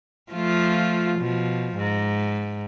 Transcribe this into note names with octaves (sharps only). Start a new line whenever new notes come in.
F3 A3 F4
B2 F3
G#2